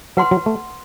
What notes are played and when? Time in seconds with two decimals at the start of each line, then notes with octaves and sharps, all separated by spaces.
0.17 F#3 B4 F#5 C6
0.31 F#3
0.46 A3